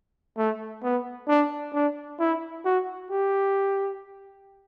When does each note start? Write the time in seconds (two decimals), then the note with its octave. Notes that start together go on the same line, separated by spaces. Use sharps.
0.38 A3
0.83 B3
1.28 D4
1.74 D4
2.19 E4
2.65 F#4
3.11 G4